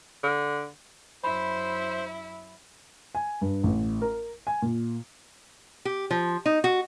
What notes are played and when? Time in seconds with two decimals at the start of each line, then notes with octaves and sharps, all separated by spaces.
0.24 D3
1.24 F#2 E4 C5 E5 B5
3.15 G#5
3.41 G2
3.64 A1
4.02 A#4
4.47 G#5
4.62 A#2
5.85 G4
6.11 F3
6.46 D#4
6.64 F#4